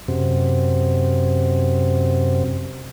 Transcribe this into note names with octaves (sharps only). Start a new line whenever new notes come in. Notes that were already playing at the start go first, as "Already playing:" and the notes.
F#2 C3